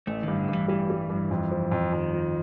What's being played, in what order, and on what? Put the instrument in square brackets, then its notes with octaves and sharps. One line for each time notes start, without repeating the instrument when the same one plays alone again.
[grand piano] A1 [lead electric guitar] A3
[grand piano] G2 [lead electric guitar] D#3
[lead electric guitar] D3
[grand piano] G2 [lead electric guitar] E3
[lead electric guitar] E3 [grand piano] G3
[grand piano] G3
G2
F2
F3
F2
[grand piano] F2 [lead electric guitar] D#3
[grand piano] F3